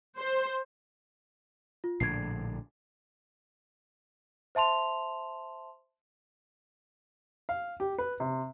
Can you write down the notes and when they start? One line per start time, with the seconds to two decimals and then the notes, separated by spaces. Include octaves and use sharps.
0.17 C5
1.84 F4
2.00 A#1 A2 D3 G#6 C7
4.55 C5 E5 A5 C6 F7
7.49 F5
7.80 G4
7.98 B4
8.20 C3